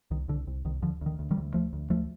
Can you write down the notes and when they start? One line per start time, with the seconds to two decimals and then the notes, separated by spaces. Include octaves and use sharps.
0.11 C2 D#3
0.28 C2 D3
0.47 C2
0.65 C2 D#3
0.82 D2 D3 F3
1.01 D2 D#3
1.19 D2
1.31 D#3 G3
1.37 D2
1.54 D2 F3 A3
1.73 D2
1.90 D2 F3 A3